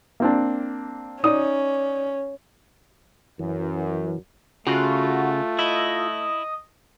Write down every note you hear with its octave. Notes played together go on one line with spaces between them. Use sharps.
A#3 C4 D4
C#4 D#4 D5 D#6
F#2 E3
C#3 A3 F4 F#4
E4 D#5